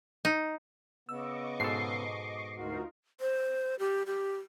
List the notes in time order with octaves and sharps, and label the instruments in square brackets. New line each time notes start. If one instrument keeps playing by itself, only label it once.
[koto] D#4
[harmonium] C#3 B3 [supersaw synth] D#5 C#6 D6 [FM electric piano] E6
[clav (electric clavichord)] G#2 B2 A4 [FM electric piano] C7
[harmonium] D2 F#4 [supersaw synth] D#4 F4 A#4
[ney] C5
G4
G4